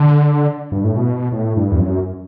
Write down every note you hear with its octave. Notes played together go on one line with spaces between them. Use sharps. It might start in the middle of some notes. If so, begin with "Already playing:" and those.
Already playing: D3
G2
A2
B2
A2
G2
E2
F#2